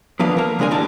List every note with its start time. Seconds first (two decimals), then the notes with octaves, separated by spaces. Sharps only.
0.19 D3 F3 A#3 B4 F5
0.37 A#3 A#4
0.59 C#3 G#3 D4 A#4 G#5
0.71 D#2 A2 D3 G3 A5